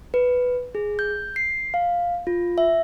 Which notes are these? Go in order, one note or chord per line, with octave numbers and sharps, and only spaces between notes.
B4
G#4
G6
C7
F5
F4
E5